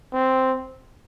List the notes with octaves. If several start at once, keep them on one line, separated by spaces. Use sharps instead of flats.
C4